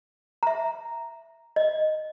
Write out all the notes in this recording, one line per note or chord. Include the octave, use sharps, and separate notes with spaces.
E5 A#5
D#5